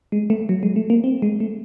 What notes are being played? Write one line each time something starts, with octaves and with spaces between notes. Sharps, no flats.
G#3
A3
F#3
G#3
A3
A#3
C4
G#3
A3